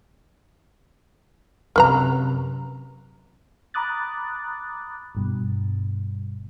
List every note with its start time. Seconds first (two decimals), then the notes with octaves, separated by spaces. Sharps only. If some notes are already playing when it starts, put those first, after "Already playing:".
1.76 F#2 C3 A#4 B4 A#5
3.74 A#5 B5 D6 D#6 F#6 A6
5.15 G1 G2 B2